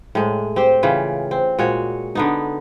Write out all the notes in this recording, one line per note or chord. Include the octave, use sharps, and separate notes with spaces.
A2 G#3
C4 G4 C5
C#3 E3 F4 G5
C4
A#2 G#3 F#4 C#5
D3 B3 D#4